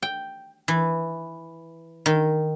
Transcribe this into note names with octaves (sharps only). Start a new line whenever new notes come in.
G5
E3
D#3